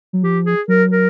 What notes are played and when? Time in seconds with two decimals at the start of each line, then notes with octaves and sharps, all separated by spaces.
0.13 F#3
0.23 F3 G4
0.46 G#4
0.68 F#3 A#4
0.91 A#4